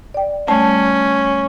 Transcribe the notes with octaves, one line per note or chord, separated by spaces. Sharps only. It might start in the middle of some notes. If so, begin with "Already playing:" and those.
D5 G5
G3 A3 C#4 A5